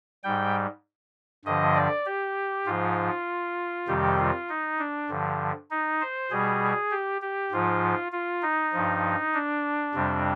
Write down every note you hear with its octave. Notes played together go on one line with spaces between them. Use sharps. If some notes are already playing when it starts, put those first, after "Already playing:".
G#2 G3 G5
G2 D3 F3 D#5
D5
G4
G#2 F3 F4
F2 C3 D#3 G3 G4
F4
D#4
D4
G2 D3 F3
D#4
C5
B2 G3 G#4
G4
G4
G#2 F3 F4
F4
D#4
G2 F3
D4
F2 C3 G3